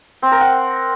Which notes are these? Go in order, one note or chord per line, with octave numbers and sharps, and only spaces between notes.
C4
A#4
F#5